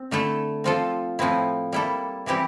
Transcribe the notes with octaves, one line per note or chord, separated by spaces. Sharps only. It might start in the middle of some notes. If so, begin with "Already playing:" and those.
Already playing: C4
D3 A3 E4 A4
F3 C4 F4 A4
A2 F3 C4 E4
G3 A#3 E4 A4
E3 G3 C4 E4 G4